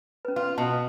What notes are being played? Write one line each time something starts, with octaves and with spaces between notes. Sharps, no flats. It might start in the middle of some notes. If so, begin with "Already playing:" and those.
C#4 B4
F4 B4
B2 A5